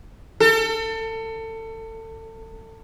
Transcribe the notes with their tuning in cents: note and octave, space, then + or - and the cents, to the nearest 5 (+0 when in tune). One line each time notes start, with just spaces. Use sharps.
A4 +30